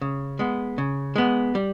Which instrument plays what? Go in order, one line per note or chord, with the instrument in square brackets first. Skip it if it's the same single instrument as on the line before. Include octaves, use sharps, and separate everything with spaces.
[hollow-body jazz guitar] C#3
G#3 B3
C#3
G#3 B3
G3